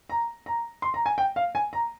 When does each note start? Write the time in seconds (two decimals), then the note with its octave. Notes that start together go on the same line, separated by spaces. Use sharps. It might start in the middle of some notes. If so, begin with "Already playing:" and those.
0.10 A#5
0.46 A#5
0.82 C6
0.94 A#5
1.06 G#5
1.18 G5
1.36 F5
1.55 G#5
1.73 A#5